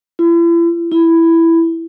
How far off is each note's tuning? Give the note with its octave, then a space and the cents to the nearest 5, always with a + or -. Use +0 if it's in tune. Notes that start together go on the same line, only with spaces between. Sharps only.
E4 +40
E4 +5